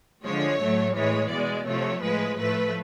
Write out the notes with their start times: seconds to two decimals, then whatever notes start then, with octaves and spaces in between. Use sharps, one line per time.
0.24 D3 F3 G#3 C#5
0.60 A2 F#3 A3
0.96 A2 E3 G#3 C#5
1.31 B2 G#3 D5
1.67 C3 F3 A3 C#5
2.02 A2 F3 G#3 B4
2.37 A2 F3 A3 B4